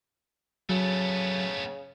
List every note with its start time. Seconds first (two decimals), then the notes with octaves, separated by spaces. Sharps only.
0.69 C#3 F#3 A3 B3